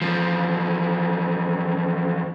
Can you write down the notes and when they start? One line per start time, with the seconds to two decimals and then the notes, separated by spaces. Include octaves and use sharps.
0.01 E2 F3